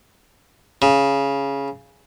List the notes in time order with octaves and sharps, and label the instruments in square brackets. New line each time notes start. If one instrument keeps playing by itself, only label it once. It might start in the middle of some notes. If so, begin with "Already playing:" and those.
[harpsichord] C#3